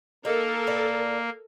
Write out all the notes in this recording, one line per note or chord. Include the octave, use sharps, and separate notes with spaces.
A#3 D#4 A4 A#4
A2 B4 D5